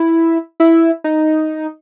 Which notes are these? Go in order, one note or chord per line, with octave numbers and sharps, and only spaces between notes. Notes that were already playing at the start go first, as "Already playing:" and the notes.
Already playing: E4
E4
D#4